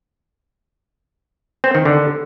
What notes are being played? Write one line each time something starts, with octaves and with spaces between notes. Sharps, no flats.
C4
D#3
D3